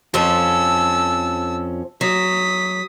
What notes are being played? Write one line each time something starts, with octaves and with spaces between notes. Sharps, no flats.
F2 F3 C#4 A5 E6
F#3 D#6 B6